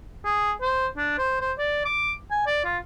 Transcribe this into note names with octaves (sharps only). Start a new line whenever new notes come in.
G#4
C5
D4
C5
C5
D5
D6
G#5
D5
F4